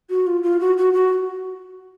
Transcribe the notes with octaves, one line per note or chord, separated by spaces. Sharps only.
F#4
F4
F4
F#4
F#4
F#4